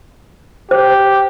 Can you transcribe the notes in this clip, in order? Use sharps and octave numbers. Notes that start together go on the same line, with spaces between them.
G4 C5